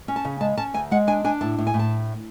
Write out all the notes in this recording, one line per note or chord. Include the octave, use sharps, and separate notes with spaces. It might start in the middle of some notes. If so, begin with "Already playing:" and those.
C#4
A5
C#3
G#3 A5
C#4 A5
D2 G#5
G#3 F#5
D4 G#5
D4 G#5
A2 A5
A2
G#5
A2
A5